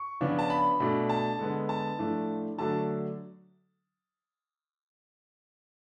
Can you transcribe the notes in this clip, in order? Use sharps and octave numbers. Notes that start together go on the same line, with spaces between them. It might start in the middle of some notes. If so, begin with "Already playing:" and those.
Already playing: C#6
C#3 F3 B3 D4
A5
B5
B2 A3 D4
A5
D3 G#3 B3
A5
A2 F3 A3 D4
D3 F#3 A3 D4 A5